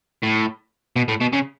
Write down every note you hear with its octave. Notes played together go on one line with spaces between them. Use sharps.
A2
B2
A2
B2
C#3